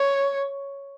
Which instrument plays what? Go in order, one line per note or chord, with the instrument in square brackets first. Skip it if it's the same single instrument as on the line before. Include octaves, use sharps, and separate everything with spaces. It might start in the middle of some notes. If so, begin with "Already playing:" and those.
Already playing: [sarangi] C#5